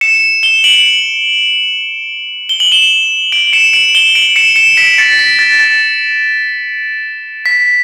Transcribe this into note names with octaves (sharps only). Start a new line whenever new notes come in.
C#7 E7
E7 G7
D7 F#7
G7
F#7
E7 G7
D7 F#7
C#7 E7
D7 F#7
E7 G7
D7 F#7
C#7 E7
C#7 E7
B6 D7
A6 C#7
B6
A6
A6
B6